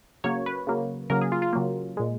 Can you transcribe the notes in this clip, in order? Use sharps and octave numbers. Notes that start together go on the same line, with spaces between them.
C#3 F#3 A#3 C#5
B4
C#3 F#3 A#3
C#3 F#3 A#3 A#4
G#4
F4
F4
C#3 F#3 A#3
A#2 G#3